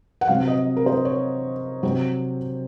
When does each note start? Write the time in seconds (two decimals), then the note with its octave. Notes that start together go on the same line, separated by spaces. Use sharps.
0.21 F#5
0.28 C3 F#3 C4 F5
0.48 D#5
0.77 A#4
0.86 C5
1.05 C#5
1.83 C3 F#3 C4